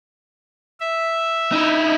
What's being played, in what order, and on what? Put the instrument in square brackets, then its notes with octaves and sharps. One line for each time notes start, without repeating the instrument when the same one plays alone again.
[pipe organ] E5
[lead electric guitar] D#4 E4